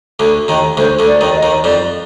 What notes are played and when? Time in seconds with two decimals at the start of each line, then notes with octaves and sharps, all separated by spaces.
0.19 D2 D3
0.48 D#2 D#3
0.77 D2 D3 C5
0.99 D2 D3
1.07 D5
1.21 D#2 D#3
1.36 D#5
1.43 D#2 D#3
1.64 F2 F3 D5